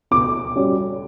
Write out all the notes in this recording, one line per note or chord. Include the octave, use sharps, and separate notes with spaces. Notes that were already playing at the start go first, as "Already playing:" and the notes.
B2 D6
G3 C#4 F#4 C#5